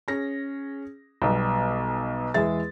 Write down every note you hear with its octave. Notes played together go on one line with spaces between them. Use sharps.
C#4 G#4 A#6
B1 B2 G3
E2 E3 G#3 G#4 E5 A6